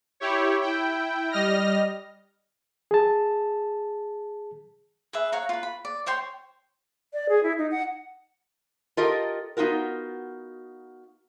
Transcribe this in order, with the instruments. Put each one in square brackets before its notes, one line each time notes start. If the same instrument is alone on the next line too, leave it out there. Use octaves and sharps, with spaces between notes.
[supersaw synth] E4 G4 C#5
E4 G5
G3 D#5 F6 A#6
[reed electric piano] G#4 A5
[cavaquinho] G#4 B4 E5
C#5 F5 F#5 A#5
F4 B4
B5
D5
C5 C#5 G5 C6
[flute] D5
G#4
E4
D#4
F#5
[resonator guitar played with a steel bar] F4 G4 A4 A#4 D#5
B3 D#4 F4 F#4 A#4